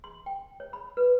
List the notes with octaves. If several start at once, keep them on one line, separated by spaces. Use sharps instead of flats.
C6
G5
C#5
B5
B4